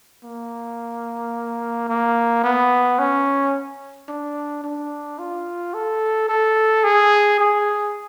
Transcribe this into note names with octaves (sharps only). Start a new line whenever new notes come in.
A#3
A#3
B3
C#4
D4
D4
F4
A4
A4
G#4
G#4